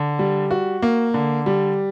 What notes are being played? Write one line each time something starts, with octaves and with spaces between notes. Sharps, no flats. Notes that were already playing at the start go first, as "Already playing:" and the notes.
Already playing: D3
G3
F#4
A#3
D3
G3